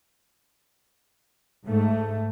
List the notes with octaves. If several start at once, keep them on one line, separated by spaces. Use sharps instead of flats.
G#2 A3